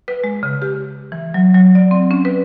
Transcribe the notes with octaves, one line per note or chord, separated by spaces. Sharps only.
B4
G#3
C#3
G4
E3
F#3
F#3
D5
C4
C#4
B4